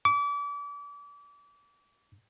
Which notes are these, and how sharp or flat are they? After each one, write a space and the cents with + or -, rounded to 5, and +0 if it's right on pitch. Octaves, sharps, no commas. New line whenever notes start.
D6 -35